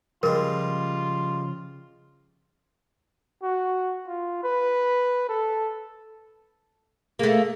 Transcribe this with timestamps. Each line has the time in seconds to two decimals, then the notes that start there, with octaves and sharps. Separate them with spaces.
0.23 C#3 F3 G3 G#3 F4 A#4
3.42 F#4
4.07 F4
4.43 B4
5.29 A4
7.19 A3 A#3 G#4